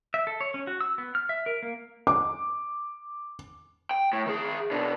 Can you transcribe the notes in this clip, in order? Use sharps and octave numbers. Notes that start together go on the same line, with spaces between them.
E5
A4
C#5
C#4
F#4
E6
B3
F6
E5
A#4
A#3
D6
G5
A2
D#3 G#4
B2 D4